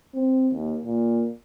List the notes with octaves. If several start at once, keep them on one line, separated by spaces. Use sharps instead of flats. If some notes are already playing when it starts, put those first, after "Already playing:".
C4
D#2
A#2